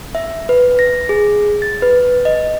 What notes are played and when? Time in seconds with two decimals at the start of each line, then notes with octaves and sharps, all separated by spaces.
0.15 E5
0.49 B4
0.79 A#6
1.09 G#4
1.62 A6
1.82 B4
2.25 D#5